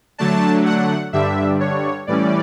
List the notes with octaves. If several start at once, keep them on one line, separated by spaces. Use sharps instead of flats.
D3 F#3 A3 D4 A5
F#5
G2 D3 G3 D4 E5
C#5
A2 E3 G3 C#4 D5